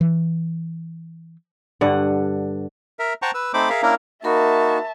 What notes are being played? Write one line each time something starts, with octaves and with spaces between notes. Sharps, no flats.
E3
G2 D3 F#5
A#4 E5
C5 F#5 G5 A5 A#5 C#6
B4 E6
A3 C4 D#4 C5 B5 D6
G#4 A#4 E5 F5
A#3 C#4 D4 E4 A#4
A#3 D#4 F#4 A#4 E5 A5 B5 C#6